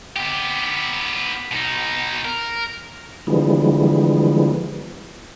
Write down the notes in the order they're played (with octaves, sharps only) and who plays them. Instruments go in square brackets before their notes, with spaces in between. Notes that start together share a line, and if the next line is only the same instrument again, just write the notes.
[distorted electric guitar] B3 G4
B2 D#4
A#4
[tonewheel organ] D3 E3 F3 G3 G#3 B3